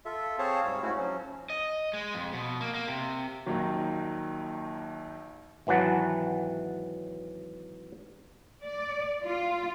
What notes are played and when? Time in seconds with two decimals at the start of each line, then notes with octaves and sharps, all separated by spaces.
0.05 F4 A4 E5
0.39 C4 G#4 C5 C#5 F5 A5
0.65 G#2 G3 C#5
0.82 G#2 A3 C#4 E4 F#4
0.97 F3 F#3 C#4
1.50 D#5
1.93 G#3
2.14 F2
2.33 B2
2.61 A#3
2.74 A#3
2.88 C3
3.46 A#1 D#2 D#3 F#3
5.67 G#1 E3 F#3 F#5 A5
8.62 D5
9.24 F4